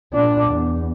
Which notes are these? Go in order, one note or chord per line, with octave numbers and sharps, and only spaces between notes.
A#2 D4
E2